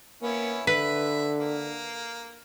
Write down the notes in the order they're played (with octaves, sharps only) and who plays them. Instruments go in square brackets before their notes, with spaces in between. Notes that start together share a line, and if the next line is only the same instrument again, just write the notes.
[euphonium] A#3 [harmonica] B3 C#4 E4
[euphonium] D3 [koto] B4 [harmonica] E5
[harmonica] A#3